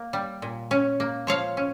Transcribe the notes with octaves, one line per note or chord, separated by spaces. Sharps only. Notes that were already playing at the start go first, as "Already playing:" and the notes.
Already playing: A#3
G3
A#2
C#4
A#3
F3 C#5 F5
C#4